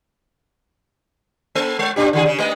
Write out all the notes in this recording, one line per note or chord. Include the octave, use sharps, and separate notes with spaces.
A#3 A4
G#3 C#5
A#2 D4 G4
D3 D#3 G#4
C#3
G#3 A3 D#5